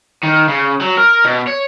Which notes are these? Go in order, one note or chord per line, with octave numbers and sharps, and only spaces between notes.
D#3
C#3
F#3
A#4
B2
C#5